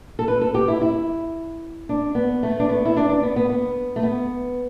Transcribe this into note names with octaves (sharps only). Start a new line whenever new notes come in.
A4
B4
A4
G4
E4
E4
D4
B3
A3
D4
B3
E4
D4
D4
B3
B3
B3
A3
B3